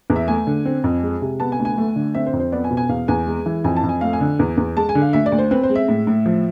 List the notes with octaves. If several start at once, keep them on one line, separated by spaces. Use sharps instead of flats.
E2
E5
A3 G#5
D3
C4
F2
G#3
C3
B3 A5
G#5
D2
G#5
A3
D3
C4 E5
C5
F2
C5
B3 D5
G#5
B2
G#5
E2 F5
E2 G#5
G#3
E3
F2 G#5
A5
F2
G#5
A3 F5
G#5
D3
E2
E2
G#3 A5
G#5
D3
F5
D2 E5
D5
D2
C5
C4 B4
C5
G#3
E5
A2
A2
F3